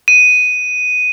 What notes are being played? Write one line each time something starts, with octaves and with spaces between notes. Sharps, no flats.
D#7